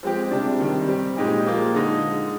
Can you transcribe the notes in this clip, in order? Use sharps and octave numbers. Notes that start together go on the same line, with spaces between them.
F3 G#3 C4 G4
C3 G3 D4
C3 D#3 G3
G3 C4 G4
A#2 G#3 D#4 G4
F3 A#3 F4
D3 G#3 D#4